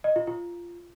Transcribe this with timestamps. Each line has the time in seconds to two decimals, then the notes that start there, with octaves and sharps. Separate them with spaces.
0.04 D#5
0.16 F4
0.27 F4